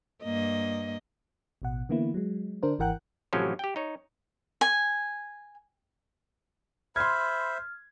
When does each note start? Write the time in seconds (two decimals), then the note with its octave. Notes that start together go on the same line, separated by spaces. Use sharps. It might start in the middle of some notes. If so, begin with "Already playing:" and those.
0.23 G2 A#3 D#5
1.62 A1 B2 F#5
1.89 D3 E3 A#3 B3 E4
2.14 F#3 G#3
2.63 D3 D4 A#4 C5
2.79 G#1 E3 A#4 F#5 G5 F#6
3.33 A1 A2 C3 F3 F#3 C#4
3.59 G4 G5
3.76 D#4 C#5
4.61 G#5
6.96 C5 E5 B5 C6 F6 G#6